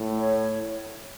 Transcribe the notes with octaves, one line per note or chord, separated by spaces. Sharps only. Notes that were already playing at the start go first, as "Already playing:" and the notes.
Already playing: A2
C#5